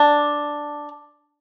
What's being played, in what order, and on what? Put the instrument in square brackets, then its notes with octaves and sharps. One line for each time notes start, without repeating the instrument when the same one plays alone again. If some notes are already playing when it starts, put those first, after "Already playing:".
Already playing: [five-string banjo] D4